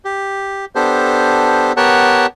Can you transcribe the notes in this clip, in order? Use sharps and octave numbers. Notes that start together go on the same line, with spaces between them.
G4
B3 D4 G4 A4 C5
B3 G4 A#4 C#5 F#5 A5